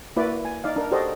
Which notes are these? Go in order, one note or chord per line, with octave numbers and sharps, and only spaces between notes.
A#3 E4 F#4 B4 D5
G#5
D#4 D5 F5
D4 A#4
F#4 G4 A4 C5 D5 D#5